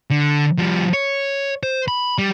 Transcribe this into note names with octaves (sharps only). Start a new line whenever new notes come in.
D3
F3 G3
C#5
C5
B5
G3